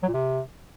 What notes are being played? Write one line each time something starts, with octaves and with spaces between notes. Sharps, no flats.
F#3
A#2
C3